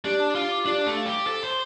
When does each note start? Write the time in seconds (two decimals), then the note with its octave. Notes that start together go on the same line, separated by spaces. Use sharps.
0.05 D4 G4
0.20 A5
0.35 F4 F5
0.51 D6
0.66 D4 G4
0.82 A3 A5
0.97 F5
1.06 G4
1.12 D6
1.27 A4 C5
1.42 C5 C6